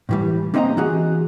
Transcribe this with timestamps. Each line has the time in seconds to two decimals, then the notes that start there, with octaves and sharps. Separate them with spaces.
0.09 A2 E3 G3
0.54 A#3 C4 D#4 D#5 F#5 A#5
0.77 E3 F#4 G#4